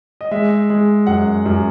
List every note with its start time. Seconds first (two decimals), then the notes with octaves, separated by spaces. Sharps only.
0.21 D#5
0.31 G#3 E5
0.70 G#3
1.07 F#2 F#5
1.46 F#2